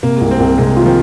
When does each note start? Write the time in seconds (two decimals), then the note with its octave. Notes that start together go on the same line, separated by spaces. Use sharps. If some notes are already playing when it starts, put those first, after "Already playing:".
0.03 C3 A#3
0.16 C2 G#3
0.31 C4
0.40 C2 A#3
0.58 C3 G#3
0.77 D#3 F4
0.86 F3